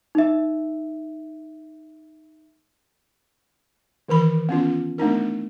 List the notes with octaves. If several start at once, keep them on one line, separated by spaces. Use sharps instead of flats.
D#4 E5
D#3 E3 A#4 B5
B3 C#4 F4
A3 B3 D4 D#4 A#4